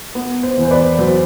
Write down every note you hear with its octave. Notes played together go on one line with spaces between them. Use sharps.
B3
C5
E2
C5
B4 D5
F#3 C5